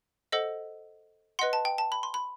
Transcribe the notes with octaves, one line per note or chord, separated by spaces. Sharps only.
A4 C5 D#5 F#5 E6
B4 D#5 F#5 C6
A5
G5
A5
B5
C6
B5